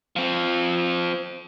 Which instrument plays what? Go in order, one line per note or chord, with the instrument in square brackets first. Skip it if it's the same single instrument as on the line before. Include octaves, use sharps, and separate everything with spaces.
[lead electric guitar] F3 C4